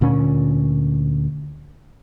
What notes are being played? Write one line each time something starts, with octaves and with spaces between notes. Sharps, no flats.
D2 A#2 D3 C#4